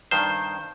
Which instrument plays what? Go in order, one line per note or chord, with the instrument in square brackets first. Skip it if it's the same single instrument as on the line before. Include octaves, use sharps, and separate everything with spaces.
[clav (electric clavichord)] G2 D#3 C5